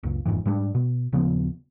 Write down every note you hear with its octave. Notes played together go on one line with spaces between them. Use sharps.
F#1 C#2
G1 F2 G#2 E3
G#2 G3 B3 D4
B2
D#1 C#3 F3 B3